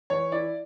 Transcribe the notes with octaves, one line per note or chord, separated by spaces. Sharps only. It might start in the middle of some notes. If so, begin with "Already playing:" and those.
E3 C#5
E4 D5